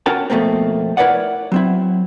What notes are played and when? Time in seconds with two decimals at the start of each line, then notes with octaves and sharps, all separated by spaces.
0.06 C#4 F#4 A#4 G5 A5
0.30 F2 B2 A3 A#3 C4
0.97 E4 A#4 B4 C#5 D5 F#5
1.52 F#3 C4 E4